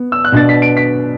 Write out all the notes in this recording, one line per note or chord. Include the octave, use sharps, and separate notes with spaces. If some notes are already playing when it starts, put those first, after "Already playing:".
Already playing: B3
E6
F#6
B2 B3 D4 A6
B6
D7
B6